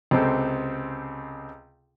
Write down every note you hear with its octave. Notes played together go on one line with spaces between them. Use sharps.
C#2 C3 C4 A4